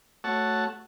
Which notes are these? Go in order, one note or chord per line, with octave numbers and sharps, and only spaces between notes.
A3 F#4 C#5 F#5 A5